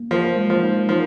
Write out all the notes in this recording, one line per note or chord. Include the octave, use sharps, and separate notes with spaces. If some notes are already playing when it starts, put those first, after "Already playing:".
Already playing: A#3
F3 A#4
G#3
F3
D#4
F3 A#4